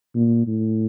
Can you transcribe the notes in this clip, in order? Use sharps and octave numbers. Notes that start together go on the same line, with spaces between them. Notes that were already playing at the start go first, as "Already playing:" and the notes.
A#2
A2